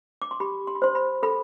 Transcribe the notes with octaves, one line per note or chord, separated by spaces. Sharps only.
D6
C6
G4 B5
C6
B5
C5 C6
B5
A4 B5